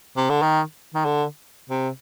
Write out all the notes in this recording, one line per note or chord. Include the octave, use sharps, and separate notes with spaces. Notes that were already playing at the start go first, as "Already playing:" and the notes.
C3
D3
D#3
D#3
D3
C3